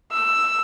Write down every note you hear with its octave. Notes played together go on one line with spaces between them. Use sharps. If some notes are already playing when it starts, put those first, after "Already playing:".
E6